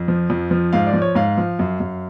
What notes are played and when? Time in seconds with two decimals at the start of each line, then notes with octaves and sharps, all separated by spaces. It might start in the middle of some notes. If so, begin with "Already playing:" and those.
Already playing: F2
0.08 F3
0.30 F2
0.51 F3
0.73 G#2 F5
0.87 D5
0.94 F3
1.02 C#5
1.15 G#2 F5
1.38 F3
1.59 F#2
1.80 F#2